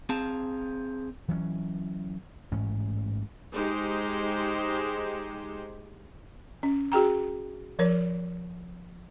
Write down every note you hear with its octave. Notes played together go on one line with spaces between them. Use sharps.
C4 G#4 F5 A5
E3 F#3 C4 C#4
A1 G#2 C#4
G#3 D#4 G4 C5
C#4
F#4 G#4 G5 A#5
F3 A#4 C#5